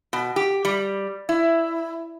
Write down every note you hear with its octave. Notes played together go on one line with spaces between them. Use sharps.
B2
G4
G3
E4